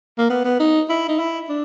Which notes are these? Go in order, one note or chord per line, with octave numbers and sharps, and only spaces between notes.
A#3
B3
B3
D#4
E4
D#4
E4
D4